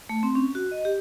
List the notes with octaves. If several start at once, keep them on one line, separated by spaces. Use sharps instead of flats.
A3
C4
C#4
F#4
D#5
G4